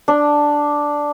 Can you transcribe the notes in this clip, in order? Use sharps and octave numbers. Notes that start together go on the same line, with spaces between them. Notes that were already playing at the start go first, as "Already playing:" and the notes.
D4